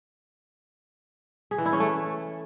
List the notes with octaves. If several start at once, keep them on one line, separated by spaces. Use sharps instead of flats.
G#4
E3
E4
C#4
A3